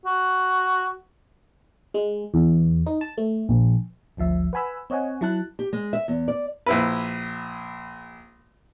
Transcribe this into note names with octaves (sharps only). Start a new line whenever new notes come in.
F#4
G#3
E2
D#4
A5
A3
A#1
G#1 D2 F3 E5
B4 F#5 G#5 B5 E6
C4 C#5 D#5 F#5 G#5
F#3 E4 A5 F#6
G4
G#3
E5
E2
D5
A#1 E4 B4